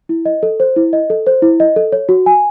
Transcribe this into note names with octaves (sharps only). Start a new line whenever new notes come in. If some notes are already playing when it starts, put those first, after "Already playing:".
E4
D#5
A4
C5
E4
D#5
A4
C5
E4
D#5
A4
C#5
F#4
G#5